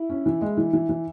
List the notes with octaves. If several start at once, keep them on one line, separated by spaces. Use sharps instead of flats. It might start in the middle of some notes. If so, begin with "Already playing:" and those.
Already playing: E4
C#4
E3
G#3
E3
E3
E3